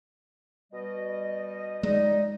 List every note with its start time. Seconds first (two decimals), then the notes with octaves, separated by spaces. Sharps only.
0.72 B2 G3 D#5
1.83 C#2 G#3 D#4 D5 D#5